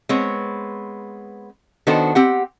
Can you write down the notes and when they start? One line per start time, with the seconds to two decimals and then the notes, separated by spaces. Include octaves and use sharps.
0.09 G#3 B3 C4 C#5
1.87 D#3 B3 D4 F#4 A4 C5
2.15 C4 G4 F#5